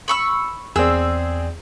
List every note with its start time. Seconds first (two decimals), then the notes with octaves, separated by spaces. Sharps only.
0.08 B5 C#6 E6
0.76 E2 C4 G#4 D5 E6